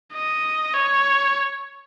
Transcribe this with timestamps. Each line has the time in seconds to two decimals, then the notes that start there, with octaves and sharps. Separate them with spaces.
0.14 D#5
0.73 C#5